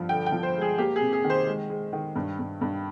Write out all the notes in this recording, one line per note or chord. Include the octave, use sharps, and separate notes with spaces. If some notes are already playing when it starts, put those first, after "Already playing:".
Already playing: G2 F3
D3 G5
G5
F3
C5
G#3
G#4
A#3 G4
C3 G#4
G#4
D#3
C5
G#3
G#3
D#3
G2
G2
G2